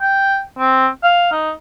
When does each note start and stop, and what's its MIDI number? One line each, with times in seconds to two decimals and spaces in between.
0.01 0.41 79
0.58 0.88 60
1.03 1.28 77
1.32 1.52 63